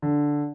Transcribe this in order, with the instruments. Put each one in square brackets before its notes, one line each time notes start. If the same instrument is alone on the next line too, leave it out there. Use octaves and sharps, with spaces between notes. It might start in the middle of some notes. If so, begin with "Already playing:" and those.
[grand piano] D3